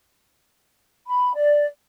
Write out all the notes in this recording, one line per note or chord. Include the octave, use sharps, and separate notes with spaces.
B5
D5